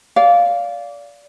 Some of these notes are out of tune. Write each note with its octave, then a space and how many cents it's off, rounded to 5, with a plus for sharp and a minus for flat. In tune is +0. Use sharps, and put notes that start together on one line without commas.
D5 -25 F5 +0